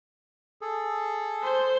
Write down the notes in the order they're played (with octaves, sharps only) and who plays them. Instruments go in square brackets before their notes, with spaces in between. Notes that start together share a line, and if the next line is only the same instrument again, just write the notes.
[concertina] G#4 A4
[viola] C5